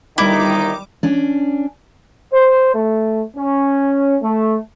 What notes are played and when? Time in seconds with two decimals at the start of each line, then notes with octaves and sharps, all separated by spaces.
0.18 G1 D#3 G3 D#4 E4 D6
1.03 C#4 D4
2.33 C5
2.74 A3
3.37 C#4
4.22 A3